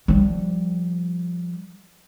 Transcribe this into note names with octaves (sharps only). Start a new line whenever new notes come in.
F3 G3